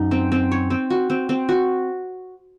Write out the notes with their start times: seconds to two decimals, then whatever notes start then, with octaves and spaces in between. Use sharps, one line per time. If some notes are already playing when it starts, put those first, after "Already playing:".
Already playing: F#2 D#4
0.11 C4
0.32 C4
0.51 C#5
0.70 C4
0.90 F#4
1.10 C4
1.29 C4
1.49 F#4